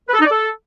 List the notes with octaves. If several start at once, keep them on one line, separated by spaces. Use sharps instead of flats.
B4
A4
D#4
D5
A4